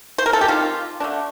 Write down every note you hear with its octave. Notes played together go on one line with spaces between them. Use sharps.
C5
A#4
A4
G4
D#3 G3 C4 F4
D3 A3 D4